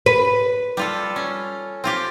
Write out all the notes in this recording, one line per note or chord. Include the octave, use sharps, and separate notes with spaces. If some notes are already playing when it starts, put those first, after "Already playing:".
B4
G3 F4 A4
C#4
C4 F4 G4